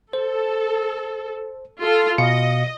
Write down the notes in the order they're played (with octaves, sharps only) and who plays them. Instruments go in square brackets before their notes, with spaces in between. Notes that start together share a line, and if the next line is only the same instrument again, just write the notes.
[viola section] A4 [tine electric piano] C5
[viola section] F4 A4
[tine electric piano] B2 F5 C#7 [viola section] D#5